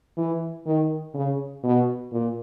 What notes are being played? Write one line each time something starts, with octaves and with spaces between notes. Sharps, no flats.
E3
D#3
C#3
B2
A#2